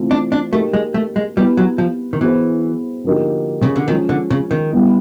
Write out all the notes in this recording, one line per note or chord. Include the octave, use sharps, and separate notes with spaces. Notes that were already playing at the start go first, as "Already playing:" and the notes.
Already playing: C3 E3 A3 C4 F4
D4
D4
A3 A#3 D#4 G4
G#3
A3
G#3
G3 B3 E4 G4 B4
F#3
F3
D#3
E3 B3 E4 G#4 C5
D3 F3 A#3 D#4 G4
C#3
D3
D#3 F3 G#3 C#4
D3
C#3
D#3
G3 B3 E4